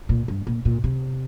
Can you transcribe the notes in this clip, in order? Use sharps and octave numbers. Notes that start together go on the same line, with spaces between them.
A#2
G2
A#2
A#2
C3